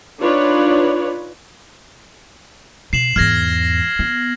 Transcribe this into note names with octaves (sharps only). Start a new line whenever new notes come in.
D4 D#4 F4 B4 C#5 D5
B2 C7 E7 F#7
E2 G#2 F6 G#6 A#6
B3